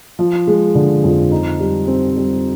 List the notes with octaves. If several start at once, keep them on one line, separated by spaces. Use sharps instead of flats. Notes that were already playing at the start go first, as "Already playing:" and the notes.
F3
G#3
D3
F2
D#4
G3
C4
G3